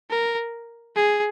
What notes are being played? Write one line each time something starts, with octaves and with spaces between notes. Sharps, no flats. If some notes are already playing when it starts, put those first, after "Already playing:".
A#4
G#4